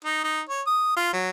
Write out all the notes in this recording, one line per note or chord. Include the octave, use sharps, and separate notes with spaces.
D#4
D#4
C#5
D#6
F4
F#3